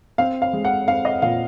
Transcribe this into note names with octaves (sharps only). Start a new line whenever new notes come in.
C4 F5
F5
G#3
F#5
C4 F5
D#5
A#2 F5